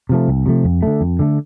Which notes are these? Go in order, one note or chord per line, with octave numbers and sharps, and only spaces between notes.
C3 F3 A3
C2
C3 F3 A3
F2
D3 A3
F2
D3 A3